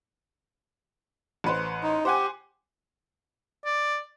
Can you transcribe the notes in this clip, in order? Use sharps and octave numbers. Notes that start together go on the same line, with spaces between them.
A1 B4 C5
D#4
G4 C5 F#5 G#5
D5